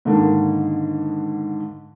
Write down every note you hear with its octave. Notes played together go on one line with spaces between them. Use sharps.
G#2 D3 D#3 A#3 D4